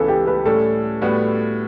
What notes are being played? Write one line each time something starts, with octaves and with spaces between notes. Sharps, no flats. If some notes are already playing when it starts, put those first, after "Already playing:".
Already playing: C#2 C#3 E3 B3 A4
G4
B4
A2 G3 C#4 A4
A2 G3 B3 F#4